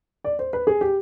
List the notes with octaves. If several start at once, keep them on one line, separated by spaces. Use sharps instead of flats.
D5
C5
B4
G#4
G4